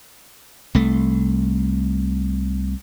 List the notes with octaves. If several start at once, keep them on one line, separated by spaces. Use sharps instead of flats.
C2 A3